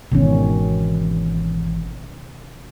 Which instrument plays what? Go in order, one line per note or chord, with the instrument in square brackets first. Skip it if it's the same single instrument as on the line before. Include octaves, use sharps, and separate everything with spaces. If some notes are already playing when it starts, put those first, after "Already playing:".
[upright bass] G#1 E3 [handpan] B2 D#3 C#4